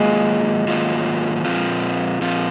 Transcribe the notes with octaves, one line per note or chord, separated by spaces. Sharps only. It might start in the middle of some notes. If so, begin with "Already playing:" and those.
Already playing: G#2 D#3 F#3 G#3 A#3 F4
G#2 D#3 F#3 A#3 F4
A#2 F3 C4 F4
A#2 F3 C4 F4